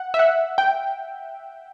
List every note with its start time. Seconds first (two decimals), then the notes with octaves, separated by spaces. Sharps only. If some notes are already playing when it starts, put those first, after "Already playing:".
Already playing: F#5
0.14 E5
0.19 F#5
0.58 G5